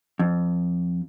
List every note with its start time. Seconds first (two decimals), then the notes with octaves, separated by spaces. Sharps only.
0.19 F2